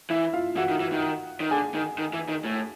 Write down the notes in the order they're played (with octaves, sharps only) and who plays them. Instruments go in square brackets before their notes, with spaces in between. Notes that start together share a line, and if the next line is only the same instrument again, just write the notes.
[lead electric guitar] E3 [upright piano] E4 E5
[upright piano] F4 F5
[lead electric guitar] E3 [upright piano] F#4 F#5
[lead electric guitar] D#3
E3
D#3
D#3
[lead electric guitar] D3 [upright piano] G#4 G#5
[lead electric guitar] D#3
D#3
E3
D#3
A2